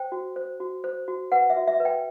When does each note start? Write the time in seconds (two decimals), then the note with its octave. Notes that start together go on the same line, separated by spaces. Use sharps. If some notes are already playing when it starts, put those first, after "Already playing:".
Already playing: C5 G5
0.12 F#4
0.36 C5
0.60 F#4
0.84 C5
1.08 F#4
1.32 B4 F#5
1.50 E5
1.56 F#4
1.68 E5
1.80 B4
1.85 G5